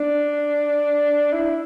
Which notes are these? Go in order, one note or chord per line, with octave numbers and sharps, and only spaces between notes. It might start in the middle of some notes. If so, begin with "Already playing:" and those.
Already playing: D4
E4